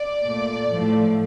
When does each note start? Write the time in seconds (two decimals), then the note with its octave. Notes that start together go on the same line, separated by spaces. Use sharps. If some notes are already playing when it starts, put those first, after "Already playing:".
Already playing: D5
0.23 A#2 A3
0.70 A2 F3 A3